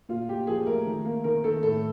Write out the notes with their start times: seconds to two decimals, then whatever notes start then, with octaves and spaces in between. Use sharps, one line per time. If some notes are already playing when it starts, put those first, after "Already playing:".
0.09 A#2 F4
0.29 A#2 G4
0.47 F3 G#4
0.66 A3 A#4
0.86 D#3
1.05 A#3
1.24 D#3 A#4
1.44 D#3 A4
1.63 A2 A4